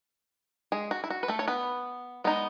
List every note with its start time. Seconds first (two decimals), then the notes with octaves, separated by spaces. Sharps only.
0.72 G#3 G#4
0.91 F#4
1.04 E4
1.10 F#4
1.23 B4
1.28 A3 A4
1.39 C#5
1.48 B3 B4
2.24 G#3 B3 D#4